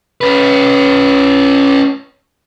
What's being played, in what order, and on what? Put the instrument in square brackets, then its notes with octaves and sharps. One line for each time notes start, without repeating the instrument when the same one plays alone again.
[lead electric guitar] C#4 B4